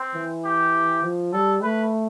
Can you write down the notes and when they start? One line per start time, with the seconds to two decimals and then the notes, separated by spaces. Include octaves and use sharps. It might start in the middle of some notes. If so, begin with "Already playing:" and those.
Already playing: C4
0.15 E3
0.45 G4
1.03 F3
1.33 G3 A4
1.63 A3 B4